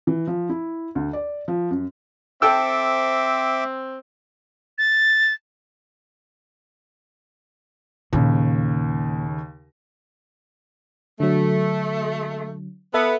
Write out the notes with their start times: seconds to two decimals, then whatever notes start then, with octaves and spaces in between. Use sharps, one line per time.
0.07 E3
0.27 F3
0.49 E4
0.95 D2
1.13 D5
1.48 F3
1.71 F#2
2.42 C4 A4 E5 G5 D6 E6
4.78 A6
8.13 D#2 A#2 C#3
11.20 D3 F#3 A3
12.94 B3 A4 E5